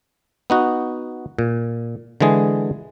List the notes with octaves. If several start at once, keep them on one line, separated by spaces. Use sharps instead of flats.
B3 D#4 F#4
A#2
D3 E3 G#3 G#4